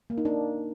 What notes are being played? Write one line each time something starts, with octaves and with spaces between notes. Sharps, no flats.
A#3
D#4
D4